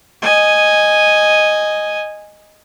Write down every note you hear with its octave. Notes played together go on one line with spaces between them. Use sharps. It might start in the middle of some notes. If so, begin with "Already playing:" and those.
D#5 G#5